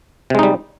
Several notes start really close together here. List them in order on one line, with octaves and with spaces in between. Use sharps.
C3 G#3 D#4 G3